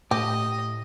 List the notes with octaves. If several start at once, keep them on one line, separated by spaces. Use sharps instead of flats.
A2 G4 D#5